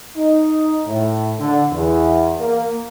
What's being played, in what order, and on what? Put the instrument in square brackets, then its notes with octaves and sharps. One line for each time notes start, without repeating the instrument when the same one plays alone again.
[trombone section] D#4
A2
D3
E2
A#3